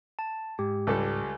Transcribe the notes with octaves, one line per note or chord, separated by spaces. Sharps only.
A5
G#2 G4
C#2 G3 A4